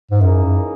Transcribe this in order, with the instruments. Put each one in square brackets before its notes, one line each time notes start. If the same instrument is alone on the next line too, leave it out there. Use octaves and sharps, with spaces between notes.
[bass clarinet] G#2
[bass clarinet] F#2 [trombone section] C#3 E3 A#3 D#4 G#4
[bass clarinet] F#2